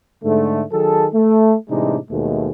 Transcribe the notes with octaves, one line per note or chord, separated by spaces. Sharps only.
G#2 D3 A3
D#3 F#3 G#4 A4
A3
A2 C3 E3 G#3 D4 D#4
D#2 B2 G#3 A3